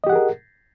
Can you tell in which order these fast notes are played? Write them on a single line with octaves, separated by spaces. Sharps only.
D#5 G4 F#5 G#4 A#4